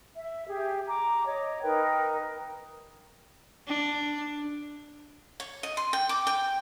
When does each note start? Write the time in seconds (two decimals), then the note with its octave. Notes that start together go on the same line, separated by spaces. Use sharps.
0.16 E5
0.48 G4 G#4
0.88 A#5 D6
1.26 C#5 D#5
1.63 D#4 A#4 B4 G5
3.67 D4
5.40 C#5
5.63 D#5
5.77 C6
5.93 G5
6.09 D6
6.27 G5